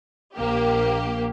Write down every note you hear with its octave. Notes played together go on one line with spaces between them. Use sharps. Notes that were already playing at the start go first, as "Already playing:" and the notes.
A#1 A#3 G4